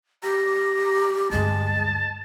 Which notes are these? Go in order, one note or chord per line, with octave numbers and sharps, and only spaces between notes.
G4 A#5
D2 G2 G#3 A5